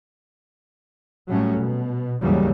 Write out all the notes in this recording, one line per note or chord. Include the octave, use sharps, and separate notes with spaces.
A2 F#3 G3 A3 C#4
B2
D#2 G#2 C#3 E3 F#3 G3